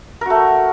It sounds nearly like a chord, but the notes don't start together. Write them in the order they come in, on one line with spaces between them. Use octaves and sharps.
A#4 F#4 A3